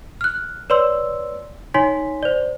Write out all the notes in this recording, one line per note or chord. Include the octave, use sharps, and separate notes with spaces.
F6 F#6
B4 C#5 D5 C6 E6
D#4 C#5 G#5 C6 B6
C5 D5